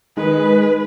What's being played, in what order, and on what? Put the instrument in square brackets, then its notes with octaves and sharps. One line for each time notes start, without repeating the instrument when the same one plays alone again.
[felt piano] D#3 [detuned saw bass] G#3 [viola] B4